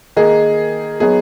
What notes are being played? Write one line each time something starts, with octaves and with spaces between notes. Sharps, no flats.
D#3 A#3 D#4 G#4
F#3 B3 D#4 G#4